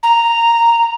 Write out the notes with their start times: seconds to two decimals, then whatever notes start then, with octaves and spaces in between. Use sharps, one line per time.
0.03 A#5